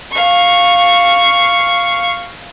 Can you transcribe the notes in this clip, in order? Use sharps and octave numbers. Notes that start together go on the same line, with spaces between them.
F5 C#6